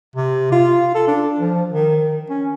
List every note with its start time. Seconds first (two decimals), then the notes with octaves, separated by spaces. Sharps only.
0.16 C3
0.52 F4
0.95 A4
1.07 D4
1.39 F3
1.73 D#3
2.30 C#4